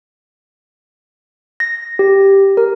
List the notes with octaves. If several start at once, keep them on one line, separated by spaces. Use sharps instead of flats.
A#6
G4
A#4